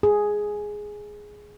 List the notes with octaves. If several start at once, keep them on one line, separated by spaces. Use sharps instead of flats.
G#4